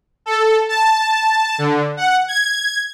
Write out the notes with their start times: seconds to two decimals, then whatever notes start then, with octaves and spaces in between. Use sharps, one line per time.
0.26 A4
0.69 A5
1.58 D3
1.97 F#5
2.28 G#6